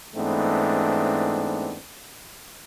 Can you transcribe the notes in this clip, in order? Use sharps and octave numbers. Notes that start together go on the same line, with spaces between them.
G#2 E3 A3 B3 C4 D4